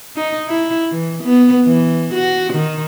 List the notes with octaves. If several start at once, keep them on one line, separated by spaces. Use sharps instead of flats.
D#4
E4
E3
B3
E3
F#4
D#3